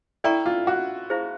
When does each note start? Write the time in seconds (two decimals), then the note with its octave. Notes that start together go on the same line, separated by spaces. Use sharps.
0.24 E4 A4 D5 G5 A#5 C#6
0.46 F4
0.67 F#4
1.10 E4 G#4 C5 F5 A5